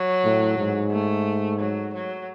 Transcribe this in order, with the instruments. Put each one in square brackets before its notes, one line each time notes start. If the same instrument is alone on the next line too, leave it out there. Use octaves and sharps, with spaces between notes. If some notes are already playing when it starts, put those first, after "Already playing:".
Already playing: [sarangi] F#3
[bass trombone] A2
G#2
[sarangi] A3
F#3
F#3